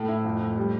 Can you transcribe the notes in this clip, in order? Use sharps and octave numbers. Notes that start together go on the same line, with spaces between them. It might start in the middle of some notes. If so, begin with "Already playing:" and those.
Already playing: A2 A4
E4
F2
F2
G3